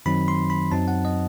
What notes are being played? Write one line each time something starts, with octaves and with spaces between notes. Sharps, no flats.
F#2 D#3 F#3 C4 D#4 B5
C6
B5
F#2 F#3 C4 D#4 A5
F#5
D#5